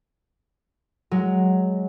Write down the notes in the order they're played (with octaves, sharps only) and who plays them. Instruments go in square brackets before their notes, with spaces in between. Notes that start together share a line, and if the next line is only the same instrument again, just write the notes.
[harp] F#3 G#3